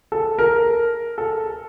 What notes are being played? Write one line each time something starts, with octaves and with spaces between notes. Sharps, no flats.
A4
A#4
A4